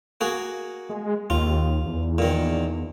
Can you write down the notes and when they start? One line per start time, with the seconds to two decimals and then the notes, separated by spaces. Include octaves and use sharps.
0.21 A#3 F#4 G#4
0.89 G#3
1.30 D#2 F4
1.86 E2
2.18 A#2 D#3